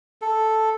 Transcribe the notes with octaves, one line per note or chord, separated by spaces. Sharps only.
A4